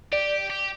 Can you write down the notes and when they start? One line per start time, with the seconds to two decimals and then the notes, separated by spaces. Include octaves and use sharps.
0.13 G4 D5
0.50 G4